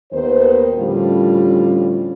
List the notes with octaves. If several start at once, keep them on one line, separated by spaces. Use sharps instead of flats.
D#2 D#3 B3 B4 C5
A2 D3 F3 G3 C#4 F4